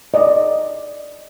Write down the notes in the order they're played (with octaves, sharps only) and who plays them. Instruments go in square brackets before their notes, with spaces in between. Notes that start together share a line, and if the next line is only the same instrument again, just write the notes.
[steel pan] D5 D#5